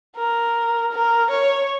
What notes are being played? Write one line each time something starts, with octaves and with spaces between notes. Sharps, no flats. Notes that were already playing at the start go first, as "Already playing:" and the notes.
A#4
A#4
C#5